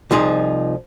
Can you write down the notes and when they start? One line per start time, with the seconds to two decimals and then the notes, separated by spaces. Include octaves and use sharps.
0.11 C2 F3 D#4 G#4